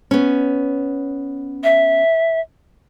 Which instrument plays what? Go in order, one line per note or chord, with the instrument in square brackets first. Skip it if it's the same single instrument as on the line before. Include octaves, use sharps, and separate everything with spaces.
[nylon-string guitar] B3 C#4
[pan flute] E5